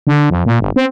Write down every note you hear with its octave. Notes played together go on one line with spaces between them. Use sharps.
D3
F2
A#2
G1
C4